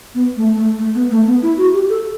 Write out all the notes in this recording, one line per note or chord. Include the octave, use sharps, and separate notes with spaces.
B3
A3
A3
A3
B3
A3
B3
E4
F#4
G4
A4